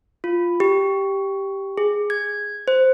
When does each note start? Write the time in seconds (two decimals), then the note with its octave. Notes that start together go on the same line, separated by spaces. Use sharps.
0.24 F4
0.60 G4
1.78 G#4
2.10 G#6
2.68 C5